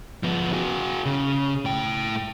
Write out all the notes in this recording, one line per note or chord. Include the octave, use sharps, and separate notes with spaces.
F3 B3
F#4 G#4
C#3
A2 G5